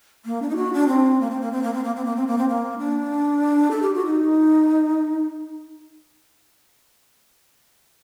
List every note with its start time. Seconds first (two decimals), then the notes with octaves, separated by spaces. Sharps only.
0.25 A#3
0.42 D4
0.49 D#4
0.56 F#4
0.73 D4
0.88 C4
1.21 A#3
1.30 C4
1.41 A#3
1.52 C4
1.63 A#3
1.73 C4
1.84 A#3
1.96 C4
2.05 A#3
2.16 C4
2.27 A#3
2.38 C4
2.48 A#3
2.79 D4
3.71 A4
3.82 G4
3.94 F#4
4.06 D#4